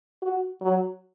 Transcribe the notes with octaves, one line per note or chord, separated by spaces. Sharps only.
F#4
F#3